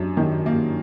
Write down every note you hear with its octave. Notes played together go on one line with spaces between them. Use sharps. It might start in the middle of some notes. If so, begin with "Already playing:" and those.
Already playing: F#2 D4
D#3
A#3